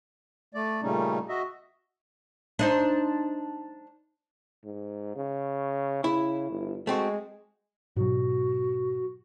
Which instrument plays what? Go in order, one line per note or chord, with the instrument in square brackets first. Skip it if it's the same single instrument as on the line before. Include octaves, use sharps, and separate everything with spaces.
[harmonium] A3 D5
A#2 C#3 G3 A3 C#4 D#4
F#4 D#5 E5
[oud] D4 D#4 C5
[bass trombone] G#2
C#3
[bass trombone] C#3 [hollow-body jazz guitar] E4
[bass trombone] G1
[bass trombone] G#3 [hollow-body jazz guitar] A3 C4 F#4
[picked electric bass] G#2 B2 F#3 [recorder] F#4